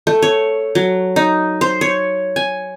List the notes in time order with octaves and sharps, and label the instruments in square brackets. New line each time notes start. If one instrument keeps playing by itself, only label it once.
[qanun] A3
C#5
F#3
D#4
C5
C#5
G#5